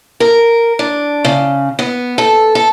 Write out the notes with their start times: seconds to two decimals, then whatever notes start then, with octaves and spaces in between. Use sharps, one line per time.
0.20 A#4
0.79 D4
1.25 C#3
1.79 B3
2.18 A4
2.55 A4